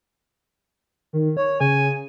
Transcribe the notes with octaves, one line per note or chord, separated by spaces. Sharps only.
D#3
C#5
C#3 G#5